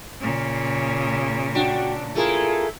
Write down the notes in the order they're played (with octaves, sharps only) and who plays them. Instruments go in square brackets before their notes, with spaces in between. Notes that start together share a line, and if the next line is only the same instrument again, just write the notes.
[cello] A#2 C#3
[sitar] D4 [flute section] F#4 G5
[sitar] A3 E4 [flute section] F4 G#4 A#4